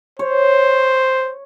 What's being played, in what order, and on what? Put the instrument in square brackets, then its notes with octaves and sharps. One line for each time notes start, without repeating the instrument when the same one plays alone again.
[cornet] C5 [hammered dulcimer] C#5